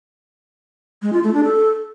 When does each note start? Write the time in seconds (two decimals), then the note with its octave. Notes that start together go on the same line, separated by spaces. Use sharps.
1.02 G#3
1.13 F4
1.23 A3
1.34 D4
1.44 A4